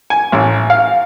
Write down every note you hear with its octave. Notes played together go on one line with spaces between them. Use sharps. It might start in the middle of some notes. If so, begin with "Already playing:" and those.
G#5
A1
F5